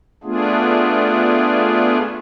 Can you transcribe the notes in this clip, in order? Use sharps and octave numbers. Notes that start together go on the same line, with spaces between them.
A3 B3 D4 F4 G#4